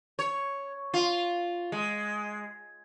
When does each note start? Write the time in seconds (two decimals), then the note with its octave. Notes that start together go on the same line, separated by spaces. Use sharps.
0.19 C#5
0.94 F4
1.72 G#3